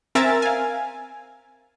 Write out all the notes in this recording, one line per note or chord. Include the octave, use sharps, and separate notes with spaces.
C4 A#4 E5 G#5 F6 A6
F5 G#5